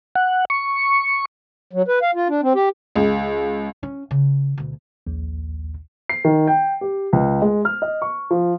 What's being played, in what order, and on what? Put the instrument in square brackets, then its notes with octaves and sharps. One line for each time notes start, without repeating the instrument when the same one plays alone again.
[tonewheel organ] F#5
C#6
[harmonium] F#3
B4
F5
F4
D4
C4
G4
[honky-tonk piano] C#2
[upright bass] C#4
C#3
D2 B2
[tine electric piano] A#1 D#2
[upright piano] C7
D#3
G5
G4
C#2
G#3
F6
D#5
C#6
F3